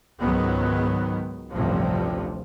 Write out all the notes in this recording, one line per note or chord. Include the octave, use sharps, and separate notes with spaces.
C#2 G#2 D#3 F#3 B3
A1 D2 G2 C3 F3